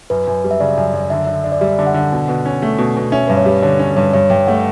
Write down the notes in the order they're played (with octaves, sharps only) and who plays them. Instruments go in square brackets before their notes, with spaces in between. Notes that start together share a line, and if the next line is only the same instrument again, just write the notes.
[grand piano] F#2 [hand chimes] B4
[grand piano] F#2
G3
[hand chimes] E5
[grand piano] C#3 [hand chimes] D5
[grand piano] F#2
F#2
[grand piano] D3 [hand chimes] E5
[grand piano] D3
D4
[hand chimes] D5
[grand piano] G3 [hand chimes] E5
[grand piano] D3
[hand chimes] F#5
[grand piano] D3
B2
B2
C#4
A3
B2
B2
[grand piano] C#4 [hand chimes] E5
[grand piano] G2 [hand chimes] B4
[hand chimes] C#5
[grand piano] G3
[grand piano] D3 [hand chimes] C#5
[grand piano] C#4 [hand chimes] C#5
[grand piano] G2 [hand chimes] C#5
[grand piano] G2 [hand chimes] C#5
[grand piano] G2 [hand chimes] G5
[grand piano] A3 [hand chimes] F#5